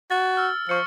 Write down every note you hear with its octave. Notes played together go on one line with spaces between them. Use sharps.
F#4 A6
E6 F6
F3 C#6 F6 C#7